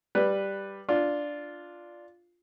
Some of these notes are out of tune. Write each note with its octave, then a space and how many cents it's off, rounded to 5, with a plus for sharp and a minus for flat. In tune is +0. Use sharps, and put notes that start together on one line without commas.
G3 +0 B4 +0
D4 +0 F4 +0